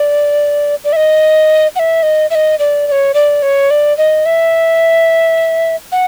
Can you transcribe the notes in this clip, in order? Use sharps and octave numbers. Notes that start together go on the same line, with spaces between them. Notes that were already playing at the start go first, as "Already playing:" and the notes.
Already playing: D5
D5
E5
D#5
F#5
E5
D#5
E5
D#5
D5
D5
C#5
D5
C#5
D5
D#5
E5
F#5